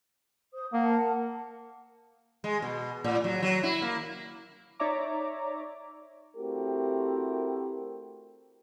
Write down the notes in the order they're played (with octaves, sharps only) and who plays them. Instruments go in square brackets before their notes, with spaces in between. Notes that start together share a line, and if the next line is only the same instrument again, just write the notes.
[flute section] C5 D#6
[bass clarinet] A#3 [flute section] A#4 F#5 A5
[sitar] G#3
B2
A2
F#3
F#3
E4
A#3
[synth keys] D#4 C#5 D5 E5 A#5 D6
[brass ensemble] A3 C4 E4 F#4 G4 A#4